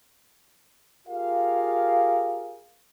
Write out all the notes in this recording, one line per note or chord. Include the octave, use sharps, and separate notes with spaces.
F4 G4 G#4 A#4 F5